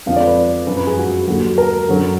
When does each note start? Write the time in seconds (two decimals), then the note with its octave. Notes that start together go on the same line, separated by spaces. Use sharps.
0.06 F2 D3 F3 F5
0.16 D5
0.27 B4
0.67 F#2 F3 B4
0.77 B4
0.87 G#4
0.97 F#4
1.27 D#2 D3 F#3 F#4
1.58 A#4
1.88 F#2 D3 F#3